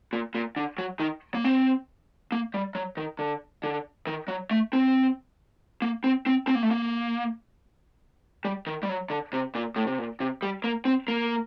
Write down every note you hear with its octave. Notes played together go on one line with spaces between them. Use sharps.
A#2
A#2
D3
F#3
D#3
A#3
C4
A#3
G3
F#3
D#3
D3
D3
D#3
F#3
A3
C4
A#3
C4
C4
C4
A#3
A3
A#3
G3
D#3
G3
F#3
D3
C3
A#2
A2
C3
A#2
C3
G3
A#3
C4
A#3